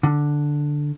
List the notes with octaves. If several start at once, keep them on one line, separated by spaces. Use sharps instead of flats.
D3